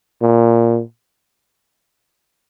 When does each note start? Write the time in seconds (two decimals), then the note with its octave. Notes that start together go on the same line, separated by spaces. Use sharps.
0.22 A#2